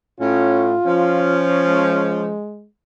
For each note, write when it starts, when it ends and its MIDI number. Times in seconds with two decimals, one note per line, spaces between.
0.20 0.75 45
0.20 0.75 61
0.20 1.45 65
0.86 2.34 53
0.86 2.34 61
1.67 2.66 56